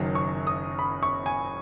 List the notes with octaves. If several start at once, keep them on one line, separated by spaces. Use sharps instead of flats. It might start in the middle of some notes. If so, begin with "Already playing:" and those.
Already playing: F#1 F#2 D#3 F#3
C#6
D#6
B5
C#6
G#5